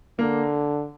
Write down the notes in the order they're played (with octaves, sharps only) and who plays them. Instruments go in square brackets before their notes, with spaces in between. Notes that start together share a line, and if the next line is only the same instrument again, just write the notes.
[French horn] D3 [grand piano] A#3